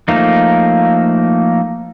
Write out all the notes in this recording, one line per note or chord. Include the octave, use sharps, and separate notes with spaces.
F3 A3 A#3 D#4